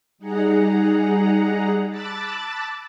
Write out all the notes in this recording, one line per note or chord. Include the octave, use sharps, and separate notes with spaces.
G3 D#4 G#4 F#5 A#5
A5 B5 D6 E6 F#6 A6